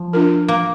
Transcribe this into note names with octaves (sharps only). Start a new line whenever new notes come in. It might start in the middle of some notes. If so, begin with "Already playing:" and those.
Already playing: F3
D4 F4 A#4
A#3